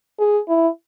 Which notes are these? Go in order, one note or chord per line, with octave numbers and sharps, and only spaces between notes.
G#4
E4